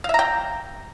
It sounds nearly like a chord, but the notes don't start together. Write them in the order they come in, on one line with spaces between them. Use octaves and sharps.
F5 E5 A#5 G5